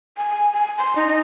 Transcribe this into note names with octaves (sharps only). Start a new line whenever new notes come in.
G#5
G#5
G#5
C6
D#4
D#4